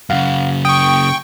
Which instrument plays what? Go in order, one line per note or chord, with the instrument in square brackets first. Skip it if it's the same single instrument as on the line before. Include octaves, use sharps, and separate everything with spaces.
[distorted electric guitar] F#2 C#3 [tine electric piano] F5 F#5
[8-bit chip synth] G5 C#6 [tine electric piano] D#6